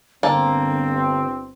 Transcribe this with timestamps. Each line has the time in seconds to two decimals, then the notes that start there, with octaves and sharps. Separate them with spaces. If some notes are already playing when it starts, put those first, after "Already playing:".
0.23 G1 D3 A#3 C4 A5